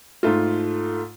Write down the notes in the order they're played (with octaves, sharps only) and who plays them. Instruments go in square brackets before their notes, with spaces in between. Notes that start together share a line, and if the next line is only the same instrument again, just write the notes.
[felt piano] G#2 A3 F4